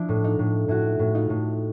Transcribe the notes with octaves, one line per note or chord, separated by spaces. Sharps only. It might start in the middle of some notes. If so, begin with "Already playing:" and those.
Already playing: F3 D4 E4
A2
D#4 F4
A2
A2 E4 F#4
A2
D#4 F4
A2